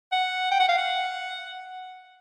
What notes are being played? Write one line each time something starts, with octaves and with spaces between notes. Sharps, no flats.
F#5
G5
F#5
F5
F#5